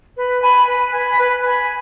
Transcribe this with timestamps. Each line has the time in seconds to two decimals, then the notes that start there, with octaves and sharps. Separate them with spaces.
0.16 B4
0.42 G#5 B5
0.67 B4
0.93 G#5 B5
1.19 B4
1.46 G#5 B5